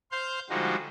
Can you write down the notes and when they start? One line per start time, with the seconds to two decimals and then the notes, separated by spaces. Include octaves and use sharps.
0.12 C5 F5 C6 G6
0.50 D3 F3 G3 G#3 D#4 F#4